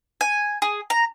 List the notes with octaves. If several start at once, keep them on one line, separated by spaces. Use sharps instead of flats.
G#5
G#4
A#5